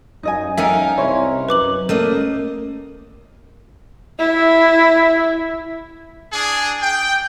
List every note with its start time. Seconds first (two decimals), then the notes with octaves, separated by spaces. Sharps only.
0.23 F#2 D#4 D#5 G#5
0.58 C#4 D#4 A4 A#4 E5 F5 G5 G#5
0.97 C2 E4 C5 C#5
1.49 F#2 B4 D6 F#7
1.89 A3 A#3 C#4 D#5
4.19 E4
6.33 D4 G#4
6.82 G5